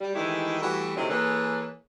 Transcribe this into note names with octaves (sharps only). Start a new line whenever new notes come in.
G3
D#3 E3 G#3 A3 E4 G4
E3 G3 A3 B3 F#4
D2 C3 D#3 F#3 A3 E4
E3 A#3 G#4 A4 B4 C#5